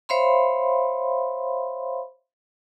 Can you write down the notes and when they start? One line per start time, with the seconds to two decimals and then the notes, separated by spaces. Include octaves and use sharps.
0.09 C5 C#5 E5 F5 B5 C6